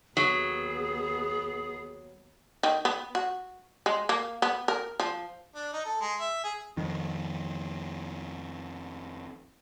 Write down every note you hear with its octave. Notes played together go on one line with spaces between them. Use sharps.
D#2 F#3 B3 G#4
D#3
B3
F#4
G#3
A#3
B3
A#4
F3
D4
D#4
A4
G#3
E5
G#4
F2 D#3